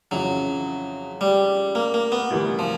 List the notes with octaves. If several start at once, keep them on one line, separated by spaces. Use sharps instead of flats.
F2 C#3 E3 F#3
G3
A#3
A#3
B3
D2 C3 E3 G3 A#3
F3